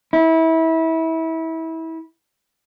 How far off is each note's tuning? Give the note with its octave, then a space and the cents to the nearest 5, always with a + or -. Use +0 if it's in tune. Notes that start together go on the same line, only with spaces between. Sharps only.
E4 -25